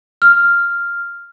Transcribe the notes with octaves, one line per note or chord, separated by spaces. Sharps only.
F6